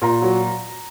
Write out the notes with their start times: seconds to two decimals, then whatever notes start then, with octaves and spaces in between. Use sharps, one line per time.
0.02 A#2 A#5
0.22 F#3